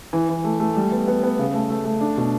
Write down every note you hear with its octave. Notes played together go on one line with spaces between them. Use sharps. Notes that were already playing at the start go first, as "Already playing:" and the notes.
E3
E3
A3
A3
G3
B3
B3
B3
C#3
A3
A3
A3
D4
B2